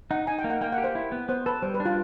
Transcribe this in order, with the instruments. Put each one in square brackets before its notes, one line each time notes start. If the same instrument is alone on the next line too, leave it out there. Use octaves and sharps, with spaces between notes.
[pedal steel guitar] D#4 [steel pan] F#5
[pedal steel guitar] D#4 [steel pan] G#5
[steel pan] G5
[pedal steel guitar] A#3
[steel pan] F#5
[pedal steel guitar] A#3 [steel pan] G5
[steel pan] F#5
[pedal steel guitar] G4
[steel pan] C5
[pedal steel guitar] E4
B3
[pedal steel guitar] B3 [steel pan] C5
[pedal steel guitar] A4 [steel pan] B4
[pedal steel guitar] G3 [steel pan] C5
[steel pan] B4
[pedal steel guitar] D4
[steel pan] F4